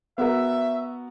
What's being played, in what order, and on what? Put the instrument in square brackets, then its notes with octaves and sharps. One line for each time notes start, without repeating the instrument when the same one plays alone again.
[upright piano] B3 F#4 A#4 [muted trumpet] E5